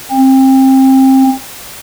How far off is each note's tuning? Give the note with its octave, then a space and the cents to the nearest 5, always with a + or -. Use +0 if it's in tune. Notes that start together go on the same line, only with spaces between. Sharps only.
C4 +25